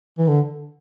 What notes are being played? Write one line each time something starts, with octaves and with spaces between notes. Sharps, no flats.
E3
D3